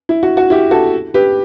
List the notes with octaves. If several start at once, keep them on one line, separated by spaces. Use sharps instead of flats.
E4
F#4
F#4
E4 G4
F#4 A4
G4 B4